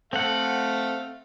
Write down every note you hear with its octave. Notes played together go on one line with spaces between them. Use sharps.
A3 C4 F5 F#5